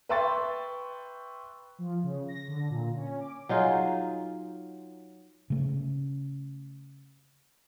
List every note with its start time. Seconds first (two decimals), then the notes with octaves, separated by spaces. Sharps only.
0.09 B4 E5 G5 C6 C#6 A6
1.79 F3
2.03 C#3
2.28 A#6
2.48 D3
2.70 A#2
2.96 C#4
3.20 D6
3.49 F#3 D#4 F4 G#4
5.50 C#3 A3 C#4